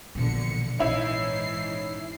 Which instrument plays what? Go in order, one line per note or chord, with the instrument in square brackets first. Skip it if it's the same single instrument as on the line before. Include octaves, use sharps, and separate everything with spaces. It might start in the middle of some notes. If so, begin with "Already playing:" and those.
[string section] A#1 D3 C#7 [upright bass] B2 E3
[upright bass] A#1 [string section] G#2 E3 C7 [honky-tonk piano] C#4 D#4 E4